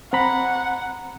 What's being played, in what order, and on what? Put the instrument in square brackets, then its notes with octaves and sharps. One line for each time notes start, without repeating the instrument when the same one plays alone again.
[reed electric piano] C4 A#5 B5 [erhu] F#5